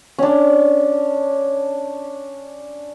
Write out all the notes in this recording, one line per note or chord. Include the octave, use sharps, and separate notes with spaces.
C#4 D4